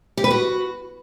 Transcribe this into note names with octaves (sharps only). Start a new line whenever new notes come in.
G4
B4
F#4